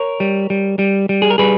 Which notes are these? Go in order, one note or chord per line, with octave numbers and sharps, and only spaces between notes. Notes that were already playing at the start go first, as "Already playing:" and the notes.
Already playing: A#4 C#5
G3
G3
G3
G3
G#4
A#4
G3 G#4 B4